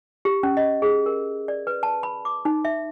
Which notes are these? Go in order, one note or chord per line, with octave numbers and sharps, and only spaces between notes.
G4
C#4
D#5
G#4
A#4
D5
B4
A5
B5
D6
D#4
E5